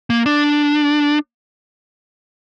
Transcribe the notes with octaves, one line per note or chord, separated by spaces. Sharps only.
A#3
D4